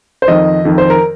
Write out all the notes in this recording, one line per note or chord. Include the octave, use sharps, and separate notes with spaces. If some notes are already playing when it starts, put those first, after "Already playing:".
C5
F2 D#3 D#5
F2 D#3
C5
A#4